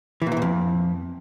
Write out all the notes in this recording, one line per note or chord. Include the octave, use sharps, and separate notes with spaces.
E3
A#2
E3
A#2
F2